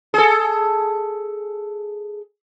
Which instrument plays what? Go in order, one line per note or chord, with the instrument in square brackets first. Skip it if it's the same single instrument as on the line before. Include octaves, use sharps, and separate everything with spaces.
[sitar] G#4 A4